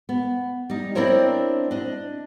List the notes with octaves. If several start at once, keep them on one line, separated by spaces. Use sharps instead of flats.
B3
G3 D#4
C4 D4 E4 A#4 C5 C#5
D4 D#5